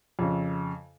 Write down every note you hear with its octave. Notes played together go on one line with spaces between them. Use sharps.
F2 C#3